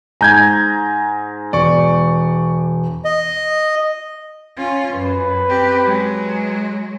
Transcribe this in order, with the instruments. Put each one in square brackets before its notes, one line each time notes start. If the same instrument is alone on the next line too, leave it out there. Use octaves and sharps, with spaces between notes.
[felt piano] G#2 G#5 [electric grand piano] A#5 G6 G#6
[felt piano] E1 [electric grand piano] D5 C#6
[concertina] D#5
[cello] C#4 F4
[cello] F#2 [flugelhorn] B4
[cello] C4 G4
F#3 G#3